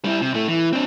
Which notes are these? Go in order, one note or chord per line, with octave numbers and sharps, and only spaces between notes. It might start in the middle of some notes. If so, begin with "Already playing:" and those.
G3 E4
C3
A2 A3
E3
C4 D4